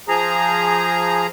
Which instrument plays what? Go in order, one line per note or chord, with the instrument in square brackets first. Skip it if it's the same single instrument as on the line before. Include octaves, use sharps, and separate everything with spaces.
[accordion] F3 G#4 A#5